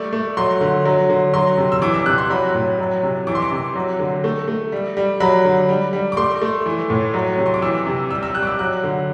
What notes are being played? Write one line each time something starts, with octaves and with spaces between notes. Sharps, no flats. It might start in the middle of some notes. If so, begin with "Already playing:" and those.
Already playing: G3 A3 D5
A3
F#3 C6
D3
F#3
D3
F#3 C6
C3
E6
E3 D6
E6
C3 F#6
C6
F#3 B5
A2
F#3
C3
E3 D6
C6
D6
C3
F#3
D3
A3
A3
G3
G3
F#3 B5
D3
G3
G3
D6
A3 C6
A3
E3
A2
F#3
C3
C6
D6
E3 E6
C3
G3 E6
E6
G3 F#6
D6
E6
F#3 F#6
D3